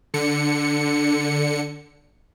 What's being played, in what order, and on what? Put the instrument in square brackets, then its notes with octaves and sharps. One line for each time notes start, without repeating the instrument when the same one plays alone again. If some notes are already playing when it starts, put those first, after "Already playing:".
[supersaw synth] D3 C#7